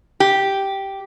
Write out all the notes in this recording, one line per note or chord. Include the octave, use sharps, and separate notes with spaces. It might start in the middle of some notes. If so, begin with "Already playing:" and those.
G4